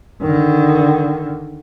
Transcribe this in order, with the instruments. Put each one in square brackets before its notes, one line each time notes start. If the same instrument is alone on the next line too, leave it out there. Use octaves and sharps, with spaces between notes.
[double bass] D3 D#3